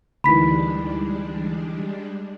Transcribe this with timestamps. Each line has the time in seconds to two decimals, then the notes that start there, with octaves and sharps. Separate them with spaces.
0.24 D2 D#3 E3 G3 G#3 D4 B5 B6